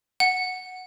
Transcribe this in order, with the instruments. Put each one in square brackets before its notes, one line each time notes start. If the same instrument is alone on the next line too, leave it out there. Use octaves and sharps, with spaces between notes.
[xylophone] F#5